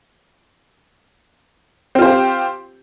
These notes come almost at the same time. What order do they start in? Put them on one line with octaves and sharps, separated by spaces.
C4 F4 C5 G4